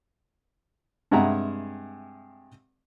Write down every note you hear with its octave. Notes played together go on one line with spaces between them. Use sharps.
G2 C3 G#3 E5 F#5 A#5